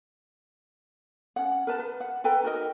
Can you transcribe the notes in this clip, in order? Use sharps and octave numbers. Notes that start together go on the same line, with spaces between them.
C#4 F#5
A#4 B4 A5
B4
F#5
A4 B4 G5 A#5
D#4 F#4 A#4 D#5